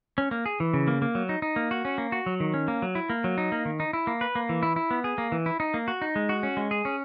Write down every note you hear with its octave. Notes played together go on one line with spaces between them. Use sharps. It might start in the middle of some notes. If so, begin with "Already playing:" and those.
C#4
A#3
G#4
E3
C#3
A#3
A#3
F#3
D#4
D#4
A#3
F#4
C#4
A#3
F#4
F#3
D#3
C#4
A#3
F#3
E4
A#3
F#3
D#4
A#3
D#3
D#4
E4
A#3
B4
A#3
E3
E4
E4
B3
G#4
A#3
E3
E4
D#4
A#3
F#4
D#4
G#3
F#4
C#4
G#3
G#4
C#4